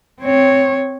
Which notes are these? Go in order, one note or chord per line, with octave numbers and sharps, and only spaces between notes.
C4 C#5